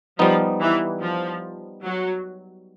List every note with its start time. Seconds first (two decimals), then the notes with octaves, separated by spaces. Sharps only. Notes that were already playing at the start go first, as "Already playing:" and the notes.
0.19 F3 G3 B3 D#4
0.60 E3
1.01 F3
1.85 F#3